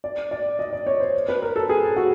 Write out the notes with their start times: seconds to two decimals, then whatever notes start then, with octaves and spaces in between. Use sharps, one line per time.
0.04 D5
0.31 D5
0.59 D#5
0.73 D5
0.87 C#5
1.00 C5
1.29 B4
1.42 A#4
1.56 A4
1.69 G#4
1.96 F#4